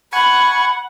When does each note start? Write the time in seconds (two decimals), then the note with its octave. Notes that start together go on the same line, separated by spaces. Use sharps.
0.13 F#5 G#5 B5 C#6